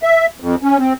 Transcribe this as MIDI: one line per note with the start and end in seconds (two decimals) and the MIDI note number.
0.03 0.26 76
0.40 0.56 41
0.63 0.78 61
0.79 0.93 60